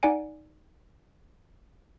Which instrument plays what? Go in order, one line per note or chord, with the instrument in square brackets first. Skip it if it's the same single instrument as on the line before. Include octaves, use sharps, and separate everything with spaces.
[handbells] D#4 D5 F#5 G#5 D7